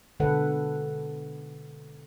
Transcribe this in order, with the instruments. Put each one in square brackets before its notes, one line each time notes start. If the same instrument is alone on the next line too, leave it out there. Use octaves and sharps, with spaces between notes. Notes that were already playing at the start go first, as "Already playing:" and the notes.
[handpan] B2 D3 G#3 A4 B4 F#5